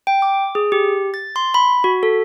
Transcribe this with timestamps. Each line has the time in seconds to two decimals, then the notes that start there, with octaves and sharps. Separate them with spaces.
0.07 G5
0.22 D6
0.55 G#4
0.72 G4
1.14 A6
1.36 C6
1.54 B5
1.84 F#4
2.03 A4